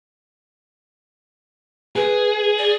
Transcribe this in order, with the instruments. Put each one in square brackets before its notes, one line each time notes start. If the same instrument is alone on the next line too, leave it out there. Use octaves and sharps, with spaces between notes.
[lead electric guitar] G#4 [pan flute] B4
[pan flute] D5